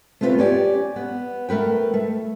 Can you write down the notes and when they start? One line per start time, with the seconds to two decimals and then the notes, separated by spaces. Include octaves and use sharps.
0.21 A3 C4 F4 G4 B4 C#5
0.38 C#4 G4 D5
0.96 B3
1.49 A3 A#4 B4 G5
1.94 A3